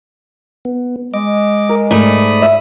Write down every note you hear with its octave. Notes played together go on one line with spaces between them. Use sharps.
B3
G#3 D#5 D6
A#4
G#2 A3 A#4 D5 B5 D#6
E5